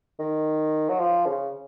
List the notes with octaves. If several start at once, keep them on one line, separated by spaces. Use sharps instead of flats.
D#3
F#3
F3
C#3